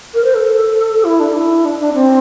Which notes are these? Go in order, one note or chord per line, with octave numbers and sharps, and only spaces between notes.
A#4
C5
A4
E4
D4
E4
D4
D4
C4